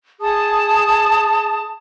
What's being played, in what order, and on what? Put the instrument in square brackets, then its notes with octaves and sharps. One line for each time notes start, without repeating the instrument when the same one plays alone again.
[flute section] G#4 A5 D#6